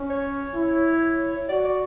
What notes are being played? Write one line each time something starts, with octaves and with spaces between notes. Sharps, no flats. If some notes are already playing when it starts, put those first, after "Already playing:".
Already playing: C#4
C#5
E4
F#4 D5
D5